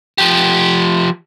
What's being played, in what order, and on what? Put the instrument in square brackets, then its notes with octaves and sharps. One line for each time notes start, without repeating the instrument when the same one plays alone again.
[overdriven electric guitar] F3 G4